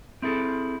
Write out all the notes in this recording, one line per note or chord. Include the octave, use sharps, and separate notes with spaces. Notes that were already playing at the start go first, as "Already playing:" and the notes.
C4 E4 G#4 A4